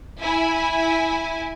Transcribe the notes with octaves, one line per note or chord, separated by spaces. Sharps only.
E4 G#5